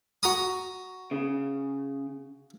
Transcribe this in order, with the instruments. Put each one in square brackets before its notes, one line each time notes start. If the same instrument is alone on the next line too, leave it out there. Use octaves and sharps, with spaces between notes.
[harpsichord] F#4 A#5 D#6
[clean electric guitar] C#3